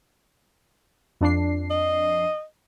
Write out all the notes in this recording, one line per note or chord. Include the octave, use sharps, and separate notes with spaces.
F2 D4 C7
D#5